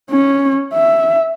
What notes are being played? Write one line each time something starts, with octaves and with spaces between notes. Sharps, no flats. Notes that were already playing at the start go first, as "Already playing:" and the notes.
C#4
E5